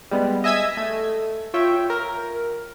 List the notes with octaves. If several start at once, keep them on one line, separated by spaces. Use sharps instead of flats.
G3 G#3 B3
D#5 E5 G#5 E6 G#6 B6
A3
F4 C#5 E5 G5
A#4